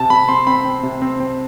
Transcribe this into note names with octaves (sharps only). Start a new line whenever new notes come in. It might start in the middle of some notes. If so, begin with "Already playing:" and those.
Already playing: C3 A5
C3 B5
C4 C6
C4 B5
C4
C3
C4
C4